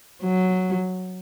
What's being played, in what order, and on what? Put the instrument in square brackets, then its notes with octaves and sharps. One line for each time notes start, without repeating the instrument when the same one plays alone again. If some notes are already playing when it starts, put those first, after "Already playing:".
[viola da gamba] F#3